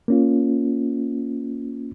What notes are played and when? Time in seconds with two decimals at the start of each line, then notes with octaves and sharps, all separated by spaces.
0.08 A#3 C#4 F4